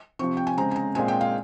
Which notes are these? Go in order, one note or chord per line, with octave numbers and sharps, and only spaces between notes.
C3 F3 C4 C#6
G5
G#5
C#3 G#3 C4 A#5
G#5
A#5
A#2 G#3 C4 G#5
G5
F5